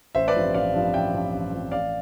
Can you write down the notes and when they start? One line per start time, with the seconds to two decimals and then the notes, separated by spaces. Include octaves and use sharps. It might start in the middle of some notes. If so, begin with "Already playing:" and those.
0.15 A1 C5 E5
0.27 B4 D5
0.35 G2 F3 C4
0.54 A1 D5 F5
0.73 G2 F3 C4
0.93 A1 E5 G5
1.13 G2 F3 C4
1.33 A1
1.52 G2 F3 C4
1.72 A1 D5 F5